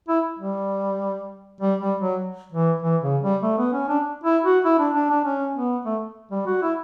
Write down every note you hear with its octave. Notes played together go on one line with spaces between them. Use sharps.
E4
G3
G3
G3
F#3
E3
E3
C#3
G3
A3
B3
C#4
D4
E4
F#4
E4
D4
D4
D4
C#4
B3
A3
G3
F#4
E4